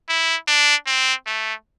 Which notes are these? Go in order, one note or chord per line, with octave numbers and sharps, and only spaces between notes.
E4
D4
C4
A3